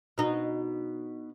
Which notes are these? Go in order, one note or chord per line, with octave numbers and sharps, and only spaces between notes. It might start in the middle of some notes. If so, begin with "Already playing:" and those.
B2 D#4